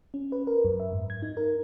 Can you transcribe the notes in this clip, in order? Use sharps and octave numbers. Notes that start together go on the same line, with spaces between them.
C#4
B4
A#4
F#2
E5
G#2
G#6
D#4
A#4